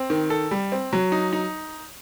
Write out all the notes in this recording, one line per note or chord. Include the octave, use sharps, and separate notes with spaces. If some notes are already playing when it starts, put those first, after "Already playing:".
Already playing: C4
D#3
A4
G3
C4
F#3
D#4
D#4